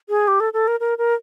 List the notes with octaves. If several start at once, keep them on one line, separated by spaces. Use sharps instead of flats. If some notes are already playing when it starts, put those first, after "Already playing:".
G#4
G4
A4
A4
A#4
A#4
A#4